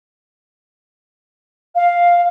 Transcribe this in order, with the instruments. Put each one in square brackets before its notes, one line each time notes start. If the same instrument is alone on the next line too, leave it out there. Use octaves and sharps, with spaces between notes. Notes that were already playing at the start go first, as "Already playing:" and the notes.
[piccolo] F5